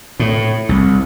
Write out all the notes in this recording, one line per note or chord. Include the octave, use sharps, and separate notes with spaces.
A2
C2